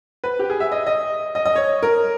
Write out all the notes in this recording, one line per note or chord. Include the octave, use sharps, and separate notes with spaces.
B4
G4
G#4
E5
D#5
D#5
D#5
D#5
C#5
A#4